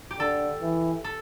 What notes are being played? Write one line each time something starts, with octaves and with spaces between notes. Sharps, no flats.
G4
D3 A4
E3
A4